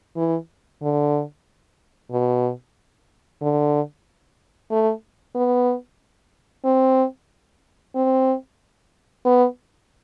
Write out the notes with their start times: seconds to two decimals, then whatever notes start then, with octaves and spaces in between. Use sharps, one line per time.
0.16 E3
0.82 D3
2.12 B2
3.42 D3
4.71 A3
5.35 B3
6.65 C4
7.95 C4
9.25 B3